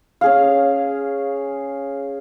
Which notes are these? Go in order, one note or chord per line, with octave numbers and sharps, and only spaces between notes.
C#4 G#4 F5